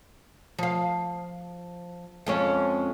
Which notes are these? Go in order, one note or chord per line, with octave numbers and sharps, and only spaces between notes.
F3 F5
F2 G#3 C#4